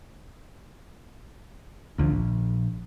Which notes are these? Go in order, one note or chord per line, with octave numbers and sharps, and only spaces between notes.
A1 D2 D3 F3
A#1